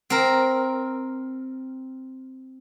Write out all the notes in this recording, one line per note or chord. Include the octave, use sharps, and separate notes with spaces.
C4 A#4